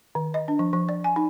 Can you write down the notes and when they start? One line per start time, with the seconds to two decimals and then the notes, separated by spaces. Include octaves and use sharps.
0.15 D#3
0.34 D#5
0.48 D4
0.59 F3
0.73 F3
0.89 D5
1.04 G#5
1.16 D#4